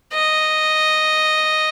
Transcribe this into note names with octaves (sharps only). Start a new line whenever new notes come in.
D#5